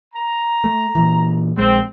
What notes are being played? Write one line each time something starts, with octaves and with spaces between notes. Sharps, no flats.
A#5
A3
A#2 E3
A#1 G#3 C4